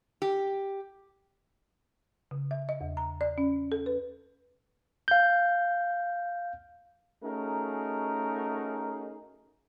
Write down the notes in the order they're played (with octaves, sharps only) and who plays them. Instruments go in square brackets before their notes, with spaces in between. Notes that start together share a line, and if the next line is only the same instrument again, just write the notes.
[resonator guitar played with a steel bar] G4
[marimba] C#3
E5
D#5
E2
A#5
D5
C#4
A4
B4
[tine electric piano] F5 G6
[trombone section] A3 C#4 D#4 F#4 G#4 A#4